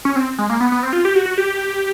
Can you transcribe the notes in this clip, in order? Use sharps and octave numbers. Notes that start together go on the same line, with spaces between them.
C#4
C4
G#3
A#3
B3
B3
C4
F4
G4
F#4
F#4
G4